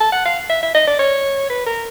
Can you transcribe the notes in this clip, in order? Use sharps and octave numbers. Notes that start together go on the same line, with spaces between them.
A5
F#5
F5
E5
E5
D#5
D5
C#5
B4
A#4